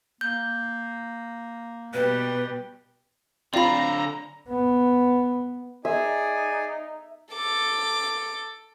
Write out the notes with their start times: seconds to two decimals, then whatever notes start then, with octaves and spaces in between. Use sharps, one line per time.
0.21 A#3 G6
1.94 B2 G3 G4 B4
3.54 D3 C4 F4 D5 F5 A#5 B5
4.49 B3
5.85 D#4 G#4 D5 E5 G#5
7.35 A4 D6